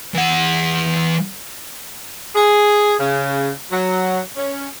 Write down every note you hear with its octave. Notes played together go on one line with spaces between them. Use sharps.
E3 F#5
G#4
C#3
F#3
C#4